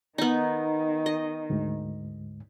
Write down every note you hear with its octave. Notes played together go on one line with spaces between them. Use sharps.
D#3 B3 D#4
D#5
D2 G#2